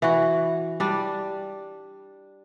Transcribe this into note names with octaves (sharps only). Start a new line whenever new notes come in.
E3 F#4
G3 D4